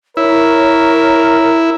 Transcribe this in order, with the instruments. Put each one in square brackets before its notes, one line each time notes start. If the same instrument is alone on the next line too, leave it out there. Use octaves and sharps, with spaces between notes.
[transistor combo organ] E4 [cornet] A#4 [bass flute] C#5